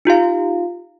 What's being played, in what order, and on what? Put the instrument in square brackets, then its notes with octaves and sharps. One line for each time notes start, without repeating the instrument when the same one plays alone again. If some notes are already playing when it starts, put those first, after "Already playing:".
[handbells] D#4 F4 G4 F5